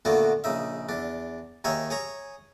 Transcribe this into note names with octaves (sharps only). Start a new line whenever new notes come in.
A#2 D3 A3 B3 F#4
A#1 C#3 D#4 E5
E2 D4
D#2 D#3 D#4 G#4 C#5 E5
G#4 C#5 A#5